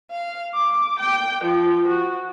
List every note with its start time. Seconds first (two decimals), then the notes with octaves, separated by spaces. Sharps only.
0.10 F5
0.53 D6
0.99 G5
1.43 F3
1.88 F#4